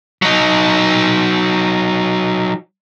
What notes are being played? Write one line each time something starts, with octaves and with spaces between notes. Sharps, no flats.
F#3 D#4